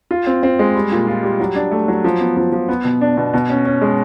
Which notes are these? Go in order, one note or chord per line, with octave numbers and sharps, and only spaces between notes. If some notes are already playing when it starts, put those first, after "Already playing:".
F4
C4
C4
G#3
G3
A#2
F4
G3
F#3
D4
A3
F#3
F3
B3
F3
F3
B3
B2
D4
B2
B2
C#4
C#4
G#3